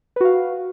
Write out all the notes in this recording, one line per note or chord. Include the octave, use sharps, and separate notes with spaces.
F#4 B4 F5